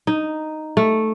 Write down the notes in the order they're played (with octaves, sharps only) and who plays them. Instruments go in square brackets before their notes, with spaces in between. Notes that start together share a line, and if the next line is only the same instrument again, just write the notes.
[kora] D#4
A3